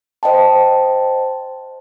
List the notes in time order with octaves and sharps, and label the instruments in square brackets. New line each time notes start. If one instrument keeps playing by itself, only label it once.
[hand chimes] C5 D#5 G5 A5